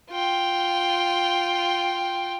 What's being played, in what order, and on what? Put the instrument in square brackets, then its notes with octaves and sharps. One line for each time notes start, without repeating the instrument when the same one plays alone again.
[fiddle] F4 G5